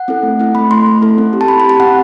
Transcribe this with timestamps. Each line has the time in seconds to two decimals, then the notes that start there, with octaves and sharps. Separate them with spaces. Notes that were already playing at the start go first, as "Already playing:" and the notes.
Already playing: F#5
0.08 C4 E4 A4
0.23 A3
0.40 C4 E4 A4
0.55 A3 B5
0.70 E4 A4 C6
0.86 A3
1.02 E4 A4
1.18 C4
1.33 G4
1.41 A5
1.48 C4 B5
1.60 B5
1.65 G4 A5
1.80 C4 F#5